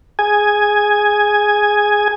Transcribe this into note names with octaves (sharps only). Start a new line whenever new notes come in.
G#4 G#5